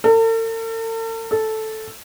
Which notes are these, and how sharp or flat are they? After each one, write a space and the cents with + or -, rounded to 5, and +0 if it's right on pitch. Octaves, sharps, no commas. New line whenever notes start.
A4 +45
A4 -5